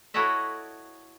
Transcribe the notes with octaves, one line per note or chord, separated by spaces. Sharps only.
E4 F#4 A4 C#5 D#5 E5